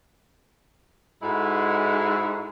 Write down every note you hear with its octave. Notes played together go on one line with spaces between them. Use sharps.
G#2 G#3 E4 F#4 A4